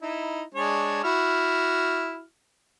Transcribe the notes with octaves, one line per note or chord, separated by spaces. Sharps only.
D#4 E4
G#3 D4 C#5
E4 F#4 F6